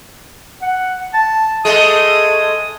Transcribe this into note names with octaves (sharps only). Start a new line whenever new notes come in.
F#5
A5
G#3 A3 D#6